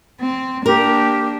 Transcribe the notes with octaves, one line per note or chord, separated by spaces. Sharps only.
C4
A#3 D4 G4 A#4